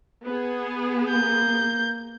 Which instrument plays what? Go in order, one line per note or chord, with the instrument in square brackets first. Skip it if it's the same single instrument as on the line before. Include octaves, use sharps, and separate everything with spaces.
[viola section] B3 G#4
[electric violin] A#3 G6